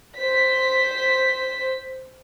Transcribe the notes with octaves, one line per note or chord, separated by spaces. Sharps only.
C5 B6